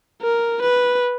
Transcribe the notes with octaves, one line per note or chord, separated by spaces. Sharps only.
A#4
B4